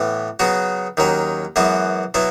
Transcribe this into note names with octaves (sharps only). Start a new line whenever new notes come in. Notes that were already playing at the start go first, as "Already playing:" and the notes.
Already playing: A2 E3 B3
C#3 F#3 B3 F#4
D#2 D#3 F#3 C#4
F#2 E3 G#3 B3 F#4
B2 F#3 B3 E4